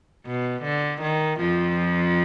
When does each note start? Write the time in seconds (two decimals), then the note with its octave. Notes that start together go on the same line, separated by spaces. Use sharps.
0.26 B2
0.64 D3
1.02 D#3
1.39 F2 F3